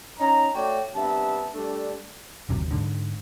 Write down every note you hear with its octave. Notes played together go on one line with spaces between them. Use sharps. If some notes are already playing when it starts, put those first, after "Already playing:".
C#4 D#4 A#5
A3 F#4 C#5 D5 G5
G2 C3 B3 E5 A5
G3 A3 D4
G1 D#2 C3 F#3
G#2 D3